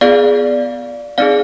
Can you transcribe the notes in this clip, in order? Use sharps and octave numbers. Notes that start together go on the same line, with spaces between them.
B3 F4 G#4 D5 F5
C4 D#4 G#4 D5 F5